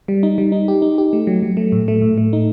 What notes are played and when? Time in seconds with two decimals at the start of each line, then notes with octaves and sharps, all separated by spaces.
0.08 G3
0.23 D#4
0.38 G3
0.52 D#4
0.68 G4
0.82 D#4
0.98 G4
1.13 A3
1.27 F#3
1.43 F#3
1.57 A3
1.72 A2
1.88 A3
2.02 A2
2.18 A3
2.33 D#4